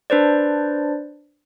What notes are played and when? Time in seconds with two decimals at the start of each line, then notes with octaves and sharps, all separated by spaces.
0.10 D4 B4 C5 D5